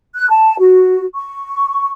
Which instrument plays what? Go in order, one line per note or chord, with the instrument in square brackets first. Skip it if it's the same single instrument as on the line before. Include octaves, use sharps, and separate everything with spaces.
[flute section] F#6
A5
F#4
C#6